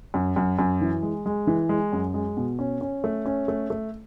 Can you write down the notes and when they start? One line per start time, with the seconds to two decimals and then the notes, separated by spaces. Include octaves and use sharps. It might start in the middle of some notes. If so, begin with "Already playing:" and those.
0.14 F#2
0.36 F#2
0.59 F#2
0.81 E3
1.03 G#3
1.26 G#3
1.47 E3
1.69 G#3
1.92 F#2
2.14 G#3
2.37 B2
2.59 C#4
2.81 C#4
3.04 A3
3.26 C#4
3.48 A3
3.70 A3